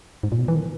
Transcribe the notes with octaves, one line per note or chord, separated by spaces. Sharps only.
G#2
A#2
B2
E3
D#3